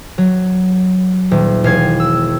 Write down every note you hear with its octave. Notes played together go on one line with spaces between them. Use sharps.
F#3
D#1
E1 F5 G#6
E6